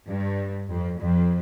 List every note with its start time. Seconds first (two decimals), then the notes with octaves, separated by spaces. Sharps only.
0.08 G2
0.69 F2
0.99 F2